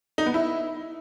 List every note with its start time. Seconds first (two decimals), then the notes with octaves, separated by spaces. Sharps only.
0.18 D#4
0.26 B3
0.34 E4